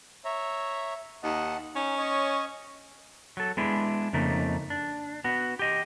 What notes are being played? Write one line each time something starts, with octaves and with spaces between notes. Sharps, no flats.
C#5 E5 A#5
D#2 D#5 F#5 A5
C#4 D#4
C#5 D#5
F#3 A4
G#3 B3 D4 E4
F2 C#3 A3 A#3 D#4
D4
B3 F#4
G4 D#5